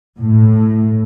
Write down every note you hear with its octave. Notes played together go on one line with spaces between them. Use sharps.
A2